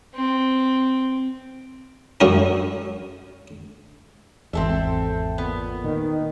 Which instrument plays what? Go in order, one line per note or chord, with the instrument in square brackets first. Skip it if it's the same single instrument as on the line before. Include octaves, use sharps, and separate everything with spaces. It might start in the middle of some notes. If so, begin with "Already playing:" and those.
[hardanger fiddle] C4
[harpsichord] F#2 C#4 A#4
[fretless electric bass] G#1 E2 [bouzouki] C4 A4 E5
[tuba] A#2 [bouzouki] B3
[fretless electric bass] A#2 [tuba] D#3